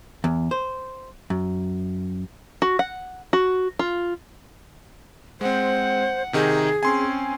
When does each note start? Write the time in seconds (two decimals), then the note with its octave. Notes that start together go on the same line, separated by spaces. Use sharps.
0.24 E2
0.51 C5
1.30 F#2
2.62 F#4
2.79 F#5
3.33 F#4
3.79 F4
5.41 G#3 C4 C5 F#5
6.33 C3 D#3 D#4 G#4
6.83 C4 C#4 G#5 C6